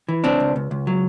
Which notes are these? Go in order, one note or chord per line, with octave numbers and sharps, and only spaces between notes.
E3
C#2 C4 D4
C#2
C#2
C#2
F#3